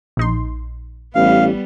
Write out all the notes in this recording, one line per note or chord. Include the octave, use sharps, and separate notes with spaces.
A#1 D#4 C6
A1 G3 B3 F5